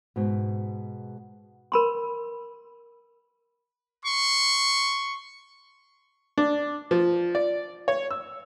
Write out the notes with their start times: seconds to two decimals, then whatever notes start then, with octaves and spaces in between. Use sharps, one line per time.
0.16 G#2 B2
1.72 A#4 B5 C6
4.04 C6 C#6
6.38 D4
6.91 F3
7.35 D5
7.88 C#5
8.11 E6